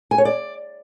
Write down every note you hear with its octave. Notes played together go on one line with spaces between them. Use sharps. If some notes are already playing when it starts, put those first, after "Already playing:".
G#5
C#5
D5